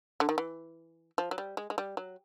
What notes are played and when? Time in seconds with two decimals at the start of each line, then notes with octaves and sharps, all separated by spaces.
0.20 D3
0.29 D#3
0.38 E3
1.18 F3
1.31 F#3
1.38 G3
1.57 G#3
1.70 G#3
1.78 G3
1.97 F#3